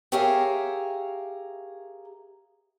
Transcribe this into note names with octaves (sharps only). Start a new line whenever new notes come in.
G4 G#4 A#4 C#5 E5 F5